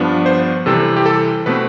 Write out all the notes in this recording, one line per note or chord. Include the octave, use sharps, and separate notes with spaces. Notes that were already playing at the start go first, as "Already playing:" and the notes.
Already playing: G2 F3 B3 D4
C5
C3 E3 G3 C4 A4
G4
A4
B2 A3 C4 B4